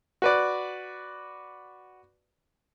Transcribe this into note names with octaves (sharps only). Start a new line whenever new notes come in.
F#4 B4 D5